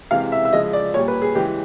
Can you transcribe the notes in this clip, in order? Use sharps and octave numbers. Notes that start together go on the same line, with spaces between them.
C3 E3 G#3 F5
E5
E5
C#3 F3 G#3 D#5
D5
A#2 G3 C#5
B4
G#4
C#3 E3 G#3 G4